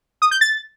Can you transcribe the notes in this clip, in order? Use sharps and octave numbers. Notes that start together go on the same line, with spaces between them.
D#6
G6
A6